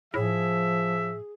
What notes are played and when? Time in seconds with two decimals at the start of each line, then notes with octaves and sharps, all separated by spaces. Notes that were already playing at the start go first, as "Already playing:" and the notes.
0.14 A2 F3 G#4 E5